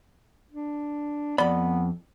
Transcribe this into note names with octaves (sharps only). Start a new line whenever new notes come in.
D4
F2 B3 D5 B5